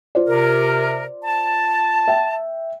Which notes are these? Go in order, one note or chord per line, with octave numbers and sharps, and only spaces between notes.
F4 C5 D5
C3 A#4
A5
E5 G5